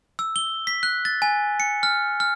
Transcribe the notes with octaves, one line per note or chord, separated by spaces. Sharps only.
E6
G7
B6
F#6
A6
G#5
C#7
F6
F6